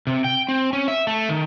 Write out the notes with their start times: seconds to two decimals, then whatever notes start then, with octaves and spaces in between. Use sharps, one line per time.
0.07 C3
0.24 G5
0.49 C4
0.73 C#4
0.88 E5
1.07 A3
1.29 D#3